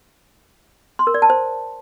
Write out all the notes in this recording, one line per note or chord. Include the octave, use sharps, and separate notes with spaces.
C6
A#4
D5
A5
C5